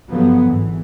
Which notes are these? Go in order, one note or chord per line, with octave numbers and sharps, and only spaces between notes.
G2 D3 F3 F#3 B3
G#1 E3